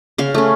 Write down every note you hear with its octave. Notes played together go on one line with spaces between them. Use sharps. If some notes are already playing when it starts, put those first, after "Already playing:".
C#3 F5
A3 C#4